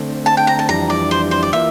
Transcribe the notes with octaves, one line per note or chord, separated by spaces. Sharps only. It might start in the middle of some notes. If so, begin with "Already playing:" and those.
Already playing: D3 A3 C4
A5
G5
A#5
A5
F2 E3 G3 D4 A#5
D5
C5
C5
D5
E3 A#3 F4 E5